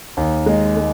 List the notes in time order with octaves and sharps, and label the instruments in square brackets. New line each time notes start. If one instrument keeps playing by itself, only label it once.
[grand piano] D#2
G#3
G#3